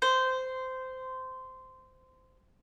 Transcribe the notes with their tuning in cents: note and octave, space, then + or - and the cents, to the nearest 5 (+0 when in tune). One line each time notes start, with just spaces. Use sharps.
C5 -15